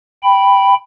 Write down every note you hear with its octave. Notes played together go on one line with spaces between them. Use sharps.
G5 B5